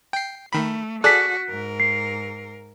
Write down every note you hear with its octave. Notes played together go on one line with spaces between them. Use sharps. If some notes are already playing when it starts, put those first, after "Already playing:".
G5 C7
D#3 A3 B5
F#4 G#4 A4 D5 F#6 B6
G#2 A#4
C7